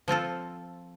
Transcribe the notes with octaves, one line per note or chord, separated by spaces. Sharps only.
F3 C4 F4 A4